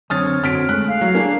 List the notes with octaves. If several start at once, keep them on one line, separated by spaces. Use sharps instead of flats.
F#2 D3 C4 C#5 D#6 F6 A6
D3 C4 F#4 F6 B6 D7
G#3 A3 F#6
F5
F#3
A#3 D4 G#4